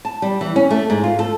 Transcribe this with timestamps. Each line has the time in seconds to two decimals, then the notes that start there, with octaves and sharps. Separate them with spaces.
0.05 A5
0.22 G3
0.41 E3
0.56 C#4
0.70 A3
0.90 G#2
1.04 F4
1.19 A4